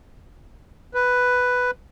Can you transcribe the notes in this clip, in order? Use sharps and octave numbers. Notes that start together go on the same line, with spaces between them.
B4